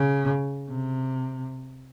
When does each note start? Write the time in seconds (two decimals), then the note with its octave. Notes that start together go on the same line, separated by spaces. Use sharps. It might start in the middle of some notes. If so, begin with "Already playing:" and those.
Already playing: C#3
0.70 C3